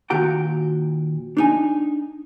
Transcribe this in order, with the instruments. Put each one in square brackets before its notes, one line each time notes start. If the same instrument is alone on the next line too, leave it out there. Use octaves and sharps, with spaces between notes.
[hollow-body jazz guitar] D#2 A#2 F#4 G5 A#5
D4 D#4 G#5